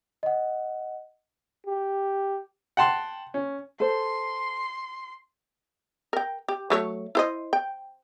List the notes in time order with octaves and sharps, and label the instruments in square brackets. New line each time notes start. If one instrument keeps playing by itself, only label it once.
[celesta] D#5 F#5
[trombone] G4
[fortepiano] F#5 G5 A5 C6
C#4
[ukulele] A4 C5 [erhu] C6
[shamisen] A#4 G5
G4
F#3 A3 C#5
E4 C5 D#5
G5